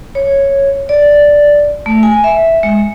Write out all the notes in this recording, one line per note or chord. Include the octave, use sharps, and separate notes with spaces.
C#5
D5
A3
G#5
E5
G#3